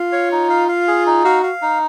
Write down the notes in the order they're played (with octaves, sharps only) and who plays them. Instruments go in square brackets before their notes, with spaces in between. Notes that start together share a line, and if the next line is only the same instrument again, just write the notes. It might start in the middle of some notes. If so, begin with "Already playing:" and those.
Already playing: [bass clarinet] F4 [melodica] F5
[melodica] C#5
D#4
F5
F5
G#4
D#4
[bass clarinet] F#4 [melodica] F5
[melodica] F5
D#4